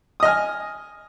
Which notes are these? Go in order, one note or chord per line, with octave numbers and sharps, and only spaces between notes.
D#5 G#5 D#6 F6